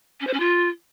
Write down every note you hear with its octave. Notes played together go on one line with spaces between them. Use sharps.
C#4
C5
C#4
F4